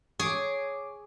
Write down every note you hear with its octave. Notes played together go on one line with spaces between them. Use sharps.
G#4 C#5 D6